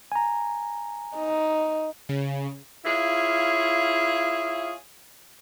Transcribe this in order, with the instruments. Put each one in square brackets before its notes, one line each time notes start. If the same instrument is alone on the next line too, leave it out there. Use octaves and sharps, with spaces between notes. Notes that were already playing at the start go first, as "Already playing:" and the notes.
[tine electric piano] G#5 A#5
[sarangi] D#4
[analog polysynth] C#3
[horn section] E4 F4 G#4 C#5 F5